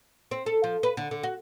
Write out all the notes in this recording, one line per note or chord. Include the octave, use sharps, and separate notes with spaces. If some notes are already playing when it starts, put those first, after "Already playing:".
C4
A4
F3
B4
D3
D3
F#4